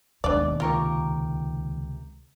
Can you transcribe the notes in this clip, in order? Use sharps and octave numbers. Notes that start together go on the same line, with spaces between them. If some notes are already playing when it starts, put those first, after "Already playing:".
D#2 B2 G#3 A#3 D4 D5
C#2 C3 F4 G4 A#4 C#6